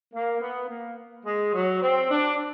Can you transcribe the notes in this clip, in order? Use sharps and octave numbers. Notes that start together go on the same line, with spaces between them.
A#3
B3
A#3
G#3
F#3
C4
D4